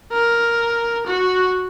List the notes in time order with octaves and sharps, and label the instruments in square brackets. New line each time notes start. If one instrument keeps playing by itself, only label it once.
[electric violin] A#4
F#4